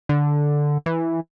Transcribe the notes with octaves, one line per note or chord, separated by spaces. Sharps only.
D3
E3